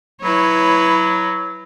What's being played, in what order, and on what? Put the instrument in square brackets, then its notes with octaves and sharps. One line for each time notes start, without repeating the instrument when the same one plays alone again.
[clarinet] F#3 [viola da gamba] E4 B4 C#5